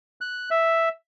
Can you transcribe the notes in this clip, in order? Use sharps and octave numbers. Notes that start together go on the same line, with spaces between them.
F#6
E5